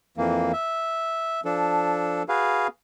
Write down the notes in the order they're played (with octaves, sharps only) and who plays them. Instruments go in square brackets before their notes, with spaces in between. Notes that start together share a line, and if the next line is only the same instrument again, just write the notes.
[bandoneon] F2 E3 A#3
E5
F3 D4 A4
F#4 G#4 B4 F5